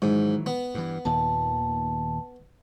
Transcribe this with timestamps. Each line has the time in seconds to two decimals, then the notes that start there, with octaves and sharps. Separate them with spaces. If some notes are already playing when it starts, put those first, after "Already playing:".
0.02 G#2 D#3 E3 F#3
0.46 B3
0.74 G2 E3
1.05 D#2 A#2 D#3 A5